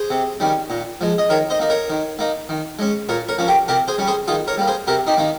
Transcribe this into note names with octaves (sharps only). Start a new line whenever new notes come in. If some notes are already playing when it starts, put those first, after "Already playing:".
Already playing: G#4 C5
C3
D#3 G3 C#4
A#2
F3 G#3
D#5
D#3 A#4 C#5
C5 D#5
A#3 D#4
A#4 C#5
D#3
A#3 D#4
D#3
G#3 C#4
A#2 A#4 C#5
A#4 C#5
F3 A#3 C#4
G4 A#4
C3 G4 A#4
G#4 C5
G3 C#4
G#4 C5
D#3 F4 G#4
A#4 C#5
G3 A#3
G#4 C5
C3 G4 A#4
D#4 G4
D#3 A#3 D#4